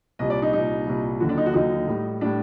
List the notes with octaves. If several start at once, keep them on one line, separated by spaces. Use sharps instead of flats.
C2 A#2 G3 D#5
D5
D#4
C2 A#2 G3 D#4
C2 A#2 G3
D#2 D3 F#3 F#4
D4
D#4
F#4
D#2 D3 F#3 D#4
A2 G3
A2 G3 D4